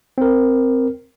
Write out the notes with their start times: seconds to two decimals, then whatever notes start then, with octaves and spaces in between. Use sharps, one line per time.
0.18 C4 A#4